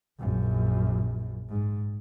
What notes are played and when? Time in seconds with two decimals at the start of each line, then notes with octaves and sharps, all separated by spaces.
0.19 A#1 F#2
1.49 G#2